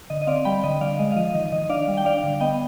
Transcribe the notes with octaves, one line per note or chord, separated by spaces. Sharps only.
D3 D#5
D#5
C4 D5 F5
G3 G5 B5
D3 D#5
D3 D5 F5
G#3 D#5
F5
F3 D#5
D#3 D#5
D#3 D#5
D4 D5 F5
G3
G5
D4 D5 F5
D3
B3 D#5 G5